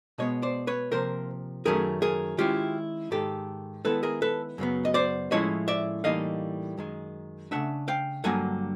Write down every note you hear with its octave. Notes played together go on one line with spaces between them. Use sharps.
B2 G#3 B3 C#5 D#5
C5 D5
B4 C#5
C3 F3 A#3 A#4 C5
F#2 D#3 F#3 A3 C#4 G#4 A#4
G#4 A#4
D#3 G#3 C#4 E4 F4 G4
G#2 D#3 G#3 G4 A4
D#3 G#3 B3 E4 A4 B4
G#4 A#4
A4 B4
F#2 C#3 F#3 B3
D#5
C5 D5
A2 F3 G#3 C#4 E4 C#5 D#5
D5 E5
A2 E3 G3 A#3 D#4 D#5 F5
F#2 D#3 G#3
C#3 E3 A3 D4 E5 F#5
F5 G5
G2 D3 F#3 A#3 F#5 G#5